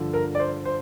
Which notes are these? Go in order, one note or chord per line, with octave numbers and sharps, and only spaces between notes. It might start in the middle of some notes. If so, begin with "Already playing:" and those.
Already playing: G2 D3 F3
A#4
D5
C5
C5